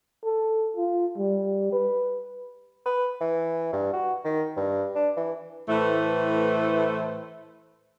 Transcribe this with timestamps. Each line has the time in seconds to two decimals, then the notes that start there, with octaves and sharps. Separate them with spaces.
0.24 A4
0.77 F4
1.18 G3
1.72 B4
2.86 B4
3.21 E3
3.73 G2
3.93 F#4
4.24 D#3
4.57 G2
4.95 D4
5.17 E3
5.68 A2 E3 A3 B4 C5